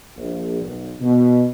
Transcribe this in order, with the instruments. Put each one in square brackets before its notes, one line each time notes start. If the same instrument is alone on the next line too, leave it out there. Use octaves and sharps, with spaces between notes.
[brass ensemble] A#1
B1
B2